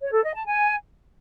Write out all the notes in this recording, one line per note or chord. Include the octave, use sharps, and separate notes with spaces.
C#5
A4
D#5
A5
G#5